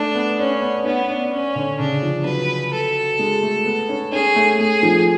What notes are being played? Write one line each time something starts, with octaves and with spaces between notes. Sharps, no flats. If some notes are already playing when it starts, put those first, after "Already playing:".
Already playing: A3 D4
B3
C#4 D4
B3
B3 C#4
D4
C#4
D3
C#3 D4
F3
F#3 B4
A4
G#3
A3
B3
C#4
C#4 G#4
A3
A3 G#4
F3